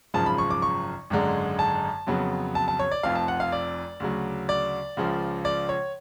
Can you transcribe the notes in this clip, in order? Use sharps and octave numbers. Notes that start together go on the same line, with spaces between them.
G#1 F#2 C#3 F3 A5
B5
C#6
D6
C#6
G#1 F#2 D3 G#3
A5
F2 C#3 F#3 B3
A5
A5
C#5
D5
F1 F2 F3 F5
A5
F#5
F5
D5
D2 C#3 F#3
D5
C#2 C#3 F3
D5
C#5